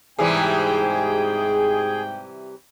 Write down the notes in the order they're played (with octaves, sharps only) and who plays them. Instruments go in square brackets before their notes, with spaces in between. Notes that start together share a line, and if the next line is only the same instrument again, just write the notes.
[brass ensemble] G#2 G5 [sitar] C3 E3 G3 [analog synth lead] G#4